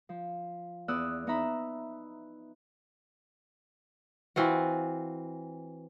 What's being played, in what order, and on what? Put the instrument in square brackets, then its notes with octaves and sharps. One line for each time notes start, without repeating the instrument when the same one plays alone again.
[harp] F3
E2 B3 D5 D#6 E6 F#6
B3 D#4 E5 A#5 B5
[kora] E3 C4 F4 F#4